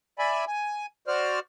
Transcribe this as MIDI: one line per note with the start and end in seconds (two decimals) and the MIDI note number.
0.19 0.45 74
0.19 0.45 76
0.19 0.45 80
0.19 0.45 83
0.47 0.86 80
1.08 1.40 66
1.08 1.40 72
1.08 1.40 74
1.08 1.40 89